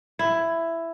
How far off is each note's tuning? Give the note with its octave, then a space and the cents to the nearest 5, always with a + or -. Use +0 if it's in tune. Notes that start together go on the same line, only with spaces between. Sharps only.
E4 +10